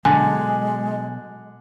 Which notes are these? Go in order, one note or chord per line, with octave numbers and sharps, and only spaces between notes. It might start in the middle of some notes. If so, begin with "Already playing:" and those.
B2 D3 F#3 G#3 G#5